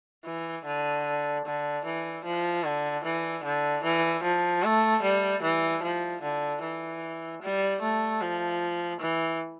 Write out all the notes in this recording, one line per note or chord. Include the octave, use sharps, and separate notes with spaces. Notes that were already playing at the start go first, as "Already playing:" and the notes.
E3
D3
D3
E3
F3
D3
E3
D3
E3
F3
A3
G3
E3
F3
D3
E3
G3
A3
F3
E3